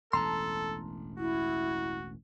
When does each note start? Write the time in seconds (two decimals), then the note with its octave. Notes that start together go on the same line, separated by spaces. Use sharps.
0.13 E1 A1 A4 A5 A#5 C6
1.19 E4 F#4